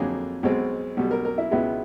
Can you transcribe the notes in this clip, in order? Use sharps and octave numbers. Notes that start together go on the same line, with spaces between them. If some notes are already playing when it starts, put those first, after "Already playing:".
Already playing: F2 D3 F#3 A#3 G#4
B1 B2 G#3 C4
B1 B2 G3
A#4
A#4
E4
C#2 B2 G#3 B3 E4